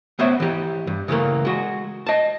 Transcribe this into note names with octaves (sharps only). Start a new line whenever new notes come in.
A3 B3 C5 C#5 E5
E3 G4
G2
C#3 E3 A3 A#3
G#3 F#4
D#5 A5